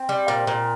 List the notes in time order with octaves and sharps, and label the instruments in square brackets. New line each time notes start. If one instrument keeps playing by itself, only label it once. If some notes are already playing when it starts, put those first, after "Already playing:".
Already playing: [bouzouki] C4
G3
A#2
A#2